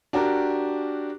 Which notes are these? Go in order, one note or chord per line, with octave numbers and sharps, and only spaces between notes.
D4 F#4 G4 A#4